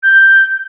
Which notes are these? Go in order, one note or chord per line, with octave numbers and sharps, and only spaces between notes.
G6